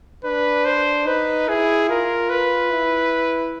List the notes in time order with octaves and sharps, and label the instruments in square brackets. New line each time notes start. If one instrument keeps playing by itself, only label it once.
[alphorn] D4 [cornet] B4
[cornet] C5
[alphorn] D#4 [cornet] B4
[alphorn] E4 [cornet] G#4
[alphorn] F4 [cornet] A#4
[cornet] B4
[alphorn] E4